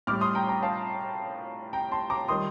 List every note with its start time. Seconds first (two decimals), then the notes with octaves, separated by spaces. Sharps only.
0.07 A2 G3 D6 F6
0.21 C6 D#6
0.35 G5 A#5
0.49 G5 A#5
0.63 F5 A5
1.73 G5 A#5
1.91 A5 C6
2.10 A#5 D6
2.28 D#3 G3 C6 D#6